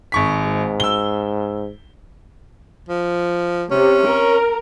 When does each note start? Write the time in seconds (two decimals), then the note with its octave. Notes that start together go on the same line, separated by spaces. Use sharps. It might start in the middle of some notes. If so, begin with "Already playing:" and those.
0.12 G#1 C#6 B6
0.46 G#2
0.80 E6 G7
2.89 F3
3.71 C3 C#4
4.06 A#4